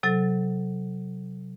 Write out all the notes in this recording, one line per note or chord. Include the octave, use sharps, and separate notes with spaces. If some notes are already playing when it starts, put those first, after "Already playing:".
C3 F#3 A4 A6